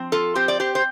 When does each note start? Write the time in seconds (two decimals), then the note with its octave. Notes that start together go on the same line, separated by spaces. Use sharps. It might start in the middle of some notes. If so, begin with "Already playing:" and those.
Already playing: F3 C4
0.12 F4 A4
0.35 C4 G4 C5
0.48 D5
0.60 G4 C5
0.75 C5